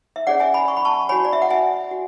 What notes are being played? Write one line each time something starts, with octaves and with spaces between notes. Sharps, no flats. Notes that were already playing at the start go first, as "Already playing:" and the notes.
E5
C#4 G#4 C#5 D5 F#5
E5 G#5
G#5 B5
C#6
B5
A5 C#6
F#4 C#5 G#5 B5
D5
E5
F#5
E5 G#5
F#4